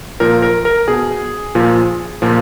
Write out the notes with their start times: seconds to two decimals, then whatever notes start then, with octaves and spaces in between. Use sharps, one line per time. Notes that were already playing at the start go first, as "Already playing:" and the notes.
0.20 A#2 F3 A#4
0.42 A#4
0.65 A#4
0.88 B2 G#4
1.55 A#2 F3
2.22 A#2 F3